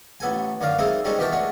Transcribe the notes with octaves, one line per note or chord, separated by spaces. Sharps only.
A1 B3 A4 G#5
F#2 D3 D5 F5 A#5
G#3 A#3 C4 D#4 E4 A4
G3 G#3 C4 C#4 D#4 A4
B2 E3 G4 A#4 G5 A5
G#3 A3 D4 F#4